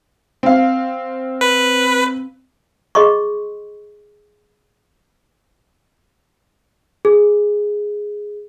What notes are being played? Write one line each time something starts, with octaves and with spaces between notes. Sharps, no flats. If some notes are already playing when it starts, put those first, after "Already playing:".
C4 F5
B4
G#4 D#5 C6 C#6
G#4